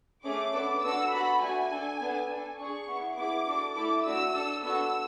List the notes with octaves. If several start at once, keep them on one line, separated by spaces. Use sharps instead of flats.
A3 C#4 G#4 D6
B3 D4 A4
B3 D4 F#4 A4 E6
B3 F#4 A4 B5
A3 D4 F#4 G#5
D4 A4
B3 D4 A4
D4 A4
D4 G#4 C#6
B3 E4 G#4
B3 E4 G#4 D6
D4 F#4 A4
A3 E4 A4 D6
A3 D4 F#4 E6
D4 A4
B3 D4 F#4 A4 E6